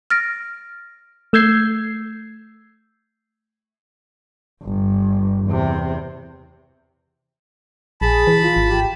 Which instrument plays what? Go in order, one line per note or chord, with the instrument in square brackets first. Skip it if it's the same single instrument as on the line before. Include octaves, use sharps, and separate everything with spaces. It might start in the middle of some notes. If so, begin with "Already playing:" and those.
[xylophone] F6 A6 A#6 D7
[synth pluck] A3 E6 G6 G#6 C7
[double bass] G1
E2 C3
[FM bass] A#1 [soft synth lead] G#4 [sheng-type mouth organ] A5 B5
[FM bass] E3
[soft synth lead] F4
[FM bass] G#1
[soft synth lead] G4